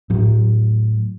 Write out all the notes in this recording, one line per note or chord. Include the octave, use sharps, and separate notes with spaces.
A2 F#3